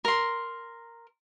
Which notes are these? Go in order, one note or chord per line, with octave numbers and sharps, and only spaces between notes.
A#4 C6